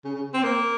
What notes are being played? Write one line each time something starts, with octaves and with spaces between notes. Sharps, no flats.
C#3
C#3
C4
A#3